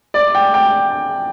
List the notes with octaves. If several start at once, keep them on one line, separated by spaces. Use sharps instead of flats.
D5
G5
G5